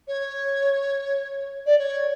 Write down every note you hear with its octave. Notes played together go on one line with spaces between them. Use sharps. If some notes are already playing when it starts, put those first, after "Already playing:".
C#5
D5
C#5